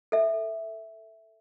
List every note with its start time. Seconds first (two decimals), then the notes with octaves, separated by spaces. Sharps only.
0.12 A4 E5